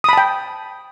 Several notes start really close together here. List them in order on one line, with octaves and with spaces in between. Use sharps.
D#6 B5 A5 G5